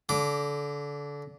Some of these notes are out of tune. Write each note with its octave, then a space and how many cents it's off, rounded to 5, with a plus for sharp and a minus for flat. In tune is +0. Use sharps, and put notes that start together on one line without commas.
D3 -25 D6 +0